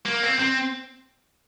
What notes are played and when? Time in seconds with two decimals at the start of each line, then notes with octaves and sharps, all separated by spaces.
0.06 A#3
0.23 C4
0.39 C4